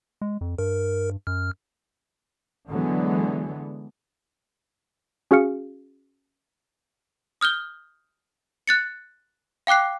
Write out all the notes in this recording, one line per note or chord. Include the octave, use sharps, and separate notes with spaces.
G#3
F2
G2 A#4
F#2 F6
D3 E3 F#3 G#3 B3
C#4 F#4 G#4 F5 F6 C#7
D#6 F6 G6 G7
F#6 A6 C#7
F5 G5 D6 F#6 C7